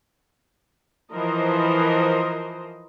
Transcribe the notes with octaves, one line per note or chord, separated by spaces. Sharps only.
E3 F3 A#4 C5 D#5